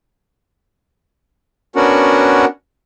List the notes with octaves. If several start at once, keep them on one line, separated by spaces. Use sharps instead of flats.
B3 C#4 D4 F#4 A#4 F#5